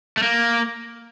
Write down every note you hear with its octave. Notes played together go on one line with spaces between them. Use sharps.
A3
A#3